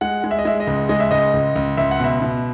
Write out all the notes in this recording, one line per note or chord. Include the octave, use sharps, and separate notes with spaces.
G#3 F#5
G#3
E5
D#5
G#3 E5
D#5
C#2
G#3 D#5
E5
C#2 D#5
C#2
C#2
C#2 E5
F#5
B2 E5
B2